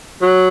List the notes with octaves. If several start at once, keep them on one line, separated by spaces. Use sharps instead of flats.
F#3